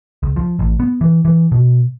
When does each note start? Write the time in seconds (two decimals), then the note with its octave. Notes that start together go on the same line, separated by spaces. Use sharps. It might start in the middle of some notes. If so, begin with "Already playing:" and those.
0.23 C#2
0.36 F3
0.59 A1
0.80 B3
1.01 E3
1.25 E3
1.52 B2